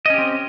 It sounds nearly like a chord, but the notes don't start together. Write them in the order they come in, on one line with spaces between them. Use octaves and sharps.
D#5 C#4 G4 C4